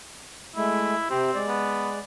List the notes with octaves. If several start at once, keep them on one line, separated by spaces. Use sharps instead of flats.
G#3 A3 E4
C3 C4 G4
G#3 D5
B3